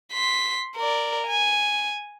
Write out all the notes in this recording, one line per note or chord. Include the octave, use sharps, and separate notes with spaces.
C6 B6
A#4 D5
G#5